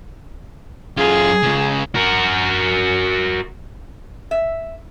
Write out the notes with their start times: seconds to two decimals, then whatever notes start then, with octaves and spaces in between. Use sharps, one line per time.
0.97 F#2 F4 G#4
1.43 C#2 C#3
1.95 F#4 A#4
4.31 E5